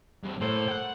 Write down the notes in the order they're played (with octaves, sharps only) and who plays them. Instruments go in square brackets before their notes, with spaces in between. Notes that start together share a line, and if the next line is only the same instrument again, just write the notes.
[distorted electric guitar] G2 C3
[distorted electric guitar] A2 [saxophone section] A#3 A4 C5
[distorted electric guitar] F#5 G5